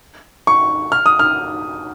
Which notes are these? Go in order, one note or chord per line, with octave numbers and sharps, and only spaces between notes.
C#6
F6
D#6
F6